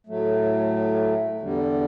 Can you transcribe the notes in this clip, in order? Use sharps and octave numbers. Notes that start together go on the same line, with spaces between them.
A2 F#3 A3
E2 D3 G3